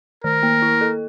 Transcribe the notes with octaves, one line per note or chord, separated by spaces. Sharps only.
D#3 A#4
A#3
E4
A4